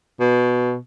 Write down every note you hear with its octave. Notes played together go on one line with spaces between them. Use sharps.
B2